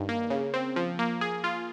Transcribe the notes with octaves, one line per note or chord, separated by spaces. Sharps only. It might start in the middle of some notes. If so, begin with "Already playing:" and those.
Already playing: G2 D#3
A#3
C#3
C4
F3
A#3
G#4
F4